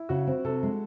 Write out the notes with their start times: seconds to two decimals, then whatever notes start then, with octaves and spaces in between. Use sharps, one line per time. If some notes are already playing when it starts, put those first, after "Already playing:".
Already playing: E4
0.09 C#3 F#4
0.27 C4
0.44 C3 A4
0.63 G#3